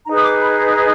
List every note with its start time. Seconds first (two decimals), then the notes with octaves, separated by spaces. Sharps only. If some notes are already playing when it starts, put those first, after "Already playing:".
0.07 D#4 G#4 B4 A#5
0.18 D#6
0.24 D6
0.42 B5